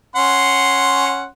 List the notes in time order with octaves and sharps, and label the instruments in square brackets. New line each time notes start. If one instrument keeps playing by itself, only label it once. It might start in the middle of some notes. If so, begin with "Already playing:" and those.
[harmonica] C#4 F#5 C6